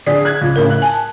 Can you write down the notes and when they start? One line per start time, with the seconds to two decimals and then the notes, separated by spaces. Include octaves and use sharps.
0.07 D3 G#4 D5 B6
0.25 F#6 G#6
0.41 C#2
0.56 A1 C#3 A#4
0.70 F#6
0.82 G#5 A5